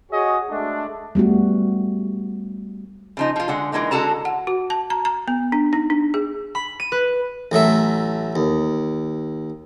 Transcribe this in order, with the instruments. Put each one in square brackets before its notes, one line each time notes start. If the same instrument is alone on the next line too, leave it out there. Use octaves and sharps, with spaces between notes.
[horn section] F#4 G#4 C#5 D#5
G#3 A3 D4
[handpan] G3 A3 B3 F#4
[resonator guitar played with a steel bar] C#3 F3 D#4
F3 F4
D3 G#3 F#5
E3 F3 G#3 A#3 D#4
D3 G#3 F#4 A4 A5 A#5
[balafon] F#5
F#4
A5
A#5
A#5
B3
D4
D#4
D4
G#4
[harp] B5
D#7
B4
[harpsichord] A1 F#3 A3 E5
D#2